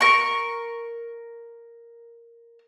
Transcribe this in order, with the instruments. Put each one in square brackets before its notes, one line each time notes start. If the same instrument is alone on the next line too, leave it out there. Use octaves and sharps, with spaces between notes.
[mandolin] A#4 C#6